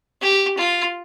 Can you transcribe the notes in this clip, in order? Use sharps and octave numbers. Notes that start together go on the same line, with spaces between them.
G4
F4